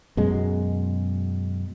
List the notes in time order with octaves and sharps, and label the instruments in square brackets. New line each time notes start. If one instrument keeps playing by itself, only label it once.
[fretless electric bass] F#2 B2 G#3